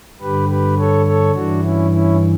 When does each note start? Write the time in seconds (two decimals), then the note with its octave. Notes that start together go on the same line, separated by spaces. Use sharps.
0.21 G2 D3 G4 B4
0.49 G4 B4
0.78 A4 C#5
1.06 A4 C#5
1.34 G2 E3 D4 F#4
1.62 C#4 E4
1.91 C#4 E4